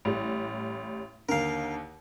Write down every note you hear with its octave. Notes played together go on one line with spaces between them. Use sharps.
A1 G3
D#2 D3 A#4 F5